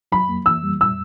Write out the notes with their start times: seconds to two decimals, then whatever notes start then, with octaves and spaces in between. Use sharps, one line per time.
0.12 F#3 B5
0.29 A#3
0.46 E3 E6
0.63 G3
0.81 A#2 E6